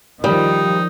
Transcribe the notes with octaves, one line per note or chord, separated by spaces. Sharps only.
D#3 F3 G3 D#4